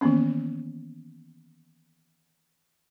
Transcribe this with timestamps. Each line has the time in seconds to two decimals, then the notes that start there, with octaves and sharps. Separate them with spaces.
0.01 D#3 E3 A#3 B3 C#4